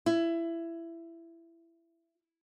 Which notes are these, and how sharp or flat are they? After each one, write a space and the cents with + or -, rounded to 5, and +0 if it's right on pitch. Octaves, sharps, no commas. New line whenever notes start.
E4 +20